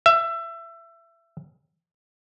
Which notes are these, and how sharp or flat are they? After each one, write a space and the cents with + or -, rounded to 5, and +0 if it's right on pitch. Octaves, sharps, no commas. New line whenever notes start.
E5 +25